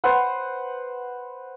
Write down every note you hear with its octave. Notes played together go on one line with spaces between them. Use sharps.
B4 C5 F#5